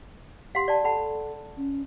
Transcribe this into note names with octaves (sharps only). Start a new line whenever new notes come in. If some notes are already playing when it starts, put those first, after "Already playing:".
G4 F5 F#5 C6
D5 A5
A4 F#5 A5 B5
C#4